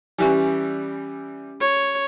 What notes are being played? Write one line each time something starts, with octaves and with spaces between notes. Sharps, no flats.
E3 G3 C#4 G4 G#5
C#5